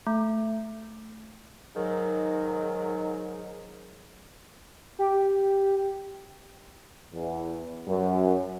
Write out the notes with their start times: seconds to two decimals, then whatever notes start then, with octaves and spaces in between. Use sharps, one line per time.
0.07 A3
1.75 G#2 D#3 F#3
4.99 G4
7.14 E2
7.88 F#2